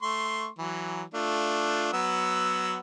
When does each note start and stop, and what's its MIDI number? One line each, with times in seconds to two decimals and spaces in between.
0.02 0.48 57
0.02 0.48 84
0.02 0.48 85
0.58 1.03 52
0.58 1.03 54
1.14 1.92 57
1.14 1.92 62
1.14 1.92 65
1.93 2.78 54
1.93 2.78 59
1.93 2.78 88